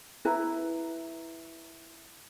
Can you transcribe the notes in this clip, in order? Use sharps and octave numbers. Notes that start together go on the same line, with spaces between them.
E4 B4 A#5